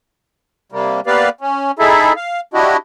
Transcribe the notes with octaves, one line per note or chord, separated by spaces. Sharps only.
C3 G3 A#3
A#3 B3 G4 B4 D5 F5
C#4
D#4 E4 G#4 A4 E5
F5
D4 E4 F#4 G4 D#5